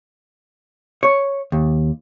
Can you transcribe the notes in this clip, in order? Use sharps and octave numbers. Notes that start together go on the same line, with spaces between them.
C#5
D#2